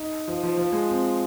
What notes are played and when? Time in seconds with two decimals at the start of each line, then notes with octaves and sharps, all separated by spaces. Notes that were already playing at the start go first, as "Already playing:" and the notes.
Already playing: D#4
0.28 F3
0.43 F3
0.57 F3
0.72 G#3
0.89 C4